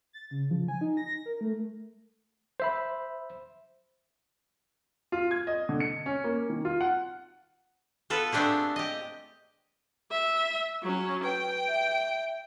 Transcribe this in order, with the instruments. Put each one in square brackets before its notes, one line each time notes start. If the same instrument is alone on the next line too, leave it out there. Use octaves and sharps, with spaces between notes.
[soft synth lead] A6
C#3
F3
G#5
D#4
A#6
A#4
A3
[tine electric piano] C5 E5 B5
[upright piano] F4
G#6
D#5
D3
C#7
C#4
A#3
D#3
F4
F#5
[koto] B3 F4 A4 B4
A3 B3 C4 D4 G4 G#4
G4 D#5
[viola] E5
F#3 C#4
[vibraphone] B4 [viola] G5
[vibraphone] E5